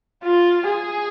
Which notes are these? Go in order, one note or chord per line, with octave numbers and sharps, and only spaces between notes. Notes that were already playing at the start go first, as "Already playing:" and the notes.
F4
G#4